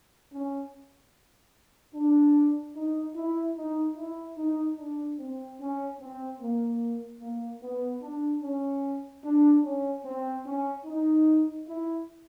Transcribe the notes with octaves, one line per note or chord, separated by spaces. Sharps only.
C#4
D4
D#4
E4
D#4
E4
D#4
D4
C4
C#4
C4
A#3
A#3
B3
D4
C#4
D4
C#4
C4
C#4
D#4
E4